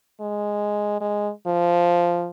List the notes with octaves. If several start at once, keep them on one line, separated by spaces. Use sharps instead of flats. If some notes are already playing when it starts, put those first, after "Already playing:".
G#3
G#3
F3